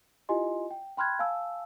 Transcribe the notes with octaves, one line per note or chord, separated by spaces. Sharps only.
E4 F4 G4 D#5 G#5 C6
G5
G5 B5 C6 F6 F#6 G#6
F5 G#5 A5 E6